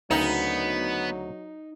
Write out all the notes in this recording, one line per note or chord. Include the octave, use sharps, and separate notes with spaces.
D2 C#3 F#3 B3 D#4 A#4